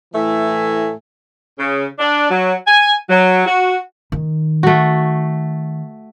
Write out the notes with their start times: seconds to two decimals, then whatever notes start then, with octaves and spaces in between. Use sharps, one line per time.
0.14 A2 E3 A3 E5 G#5
1.58 C#3
1.99 D4
2.30 F#3
2.67 G#5
3.10 F#3
3.45 F#4
4.12 D#3
4.63 A3 F#4